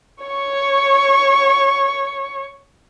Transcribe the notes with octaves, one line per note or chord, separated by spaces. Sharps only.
C#5 C#6